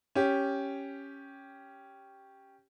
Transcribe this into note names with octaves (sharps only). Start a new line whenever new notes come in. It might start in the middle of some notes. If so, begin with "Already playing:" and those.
C#4 G4